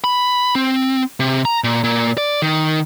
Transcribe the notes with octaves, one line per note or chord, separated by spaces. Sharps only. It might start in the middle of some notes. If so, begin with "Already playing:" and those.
B5
C4
C3
A#5
A#2
A#2
D5
D#3